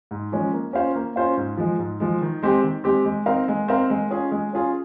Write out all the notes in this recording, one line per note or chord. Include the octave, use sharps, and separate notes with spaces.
G#2
F3 G#3 C#4
A#3
C#4 F4 C5 F5
A#3
C#4 F4 C5 F5
G#2
F3 G#3
G#2
F3 G#3
D#3
G#3 C4 G4
D#3
G#3 C4 G4
G#3
C4 D#4 A#4 F5
G#3
C4 D#4 A#4 F5
G#3
C#4 F4 G#4
G#3
C#4 F4 G#4